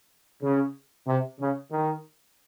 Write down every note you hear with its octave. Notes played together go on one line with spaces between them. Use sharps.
C#3
C3
C#3
D#3